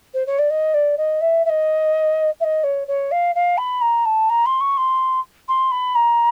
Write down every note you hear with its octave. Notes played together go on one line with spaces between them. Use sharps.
C5
C#5
D5
D#5
D5
D#5
E5
E5
D#5
E5
D#5
C#5
C#5
F5
F5
B5
A#5
A5
A#5
C6
C#6
C6
C6
B5
A#5